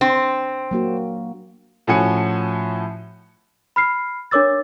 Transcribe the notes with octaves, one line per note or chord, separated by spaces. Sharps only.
C4 D4
F#3 A#3 F#4
A2 F3 C#4 F#4 G#5 C#7
B5 F6 C7
D4 A#4 C#5 D6 E6 A6